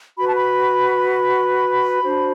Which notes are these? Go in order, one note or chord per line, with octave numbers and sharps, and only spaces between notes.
F#4 B4 B5
A5
B5
B5
D4 F#4 C5